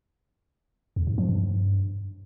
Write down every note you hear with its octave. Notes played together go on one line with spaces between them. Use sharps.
E2
G#2
F3
G2